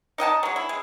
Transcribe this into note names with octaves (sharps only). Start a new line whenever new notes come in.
D#4 D#5 F#5 A5
F#3 G#3
E4
G#3